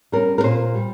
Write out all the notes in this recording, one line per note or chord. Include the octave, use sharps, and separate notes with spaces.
G3 C#4 A#4
A#4
A#2 C5
G3